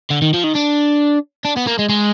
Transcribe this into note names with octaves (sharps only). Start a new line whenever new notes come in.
D3
D#3
F3
D#3
D4
D4
B3
A#3
G#3
G#3